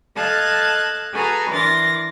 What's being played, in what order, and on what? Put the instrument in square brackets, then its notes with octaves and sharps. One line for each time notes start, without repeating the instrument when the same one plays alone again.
[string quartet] A4 D#5 F5 A5 F#6 G#6
F#4 G#4 A4 B4 G#5 A#5
E3 D4 A#4 C6 A6 A#6